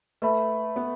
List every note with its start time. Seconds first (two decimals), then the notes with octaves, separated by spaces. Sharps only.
0.22 A3 B4 E5 B5
0.76 B3